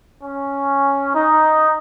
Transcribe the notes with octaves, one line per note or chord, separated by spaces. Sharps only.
C#4
D#4